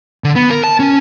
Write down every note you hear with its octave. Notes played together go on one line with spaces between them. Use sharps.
D3
B3
A#4
A5
C#4